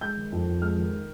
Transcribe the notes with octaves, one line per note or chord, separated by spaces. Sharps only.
G#3 G6
D#3
F2
F2
G#3 F6
D#3